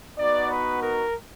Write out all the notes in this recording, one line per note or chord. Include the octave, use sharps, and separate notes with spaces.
B3 D#4 F#4 D5
B4
A#4